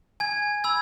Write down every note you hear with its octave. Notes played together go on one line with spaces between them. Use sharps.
G#5 G#6
B5 E6 G#6